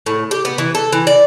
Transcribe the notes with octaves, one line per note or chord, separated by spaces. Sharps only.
A2
G4
B3
E3
A4
E3
D5